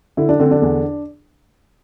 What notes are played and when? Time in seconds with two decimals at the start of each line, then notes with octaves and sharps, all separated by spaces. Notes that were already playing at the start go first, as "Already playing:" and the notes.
0.17 D3 E4
0.29 D4
0.40 D3 C4
0.51 D4
0.62 E2